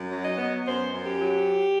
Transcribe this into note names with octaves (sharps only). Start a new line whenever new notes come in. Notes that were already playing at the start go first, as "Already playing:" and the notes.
Already playing: F#2
F#3
D#5
B3
F#2 C5
F#2
G4
F#3